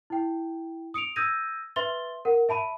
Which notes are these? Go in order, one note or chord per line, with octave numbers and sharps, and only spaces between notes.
E4 G5
D#6 C#7 D7 F7
D#6 E6 G6 G#6 A#6 D#7
B4 E5 C6 A6 G7
A#4 F#5
E5 A5 B5 D#7